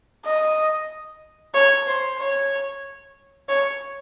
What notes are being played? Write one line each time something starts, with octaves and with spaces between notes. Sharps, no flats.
D#5
C#5
C5
C#5
C#5